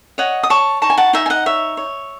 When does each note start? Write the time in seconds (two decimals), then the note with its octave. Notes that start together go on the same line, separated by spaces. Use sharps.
0.18 C#5 D#5 F#5
0.43 D#6
0.50 C#5 A5 C#6
0.82 D#4 A5 C#6
0.90 G#5
0.97 F#5 A5
1.13 D#4 E5 G#5
1.26 G#5
1.30 D#5 F#5
1.46 C#5 E5
1.77 C#5